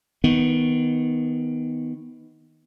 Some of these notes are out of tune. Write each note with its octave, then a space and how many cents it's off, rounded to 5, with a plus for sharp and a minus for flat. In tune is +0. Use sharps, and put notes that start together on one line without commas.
D#3 +15 B3 +0